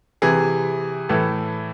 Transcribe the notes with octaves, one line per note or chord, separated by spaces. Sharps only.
C3 E3 G#4
A2 E3 A4